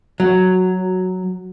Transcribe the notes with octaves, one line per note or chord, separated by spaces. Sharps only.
F#3